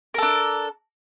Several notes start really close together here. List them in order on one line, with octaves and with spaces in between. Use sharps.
A#4 A4 D4